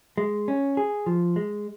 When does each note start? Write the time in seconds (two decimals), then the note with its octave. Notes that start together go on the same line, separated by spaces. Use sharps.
0.18 G#3
0.48 C#4
0.77 G#4
1.06 F3
1.36 G#3